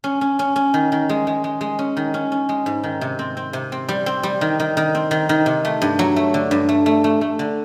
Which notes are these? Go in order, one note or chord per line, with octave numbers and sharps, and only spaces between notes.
C#4
C#4
C#4
C#4
D#3
D#3
G#3
G#3
G#3
G#3
C#4
D#3
C#4
C#4
G#3
G#2
D#3
C3
C4
C4
C3
C4
G3
C4
G3
D#3
D#3
D#3
C4
D#3
D#3
C3
A3
G2
F#3
A3
D3
G2
A3
A3
A3
A3
D3